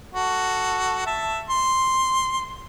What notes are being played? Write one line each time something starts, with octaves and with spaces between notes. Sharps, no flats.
F#4 A4
E5 A5
C6